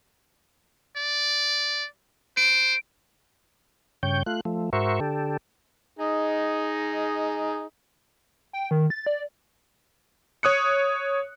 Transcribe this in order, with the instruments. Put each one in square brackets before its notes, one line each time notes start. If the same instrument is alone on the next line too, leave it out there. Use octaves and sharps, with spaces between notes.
[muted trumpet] D5
[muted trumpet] C5 [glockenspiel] D7
[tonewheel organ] G2 C#3 C#5 G5 G6
A3 F4 F#6
F3 A3
G#2 F#4 A#4 C5 E5 C#6
D3 G4 A4
[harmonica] D#4 G#4 D#5
[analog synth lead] G5
D#3
A6
D5
[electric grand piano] C#5 D#6 F#6 C#7